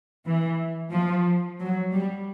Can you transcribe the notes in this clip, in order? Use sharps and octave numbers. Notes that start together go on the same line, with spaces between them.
E3
F3
F#3
G3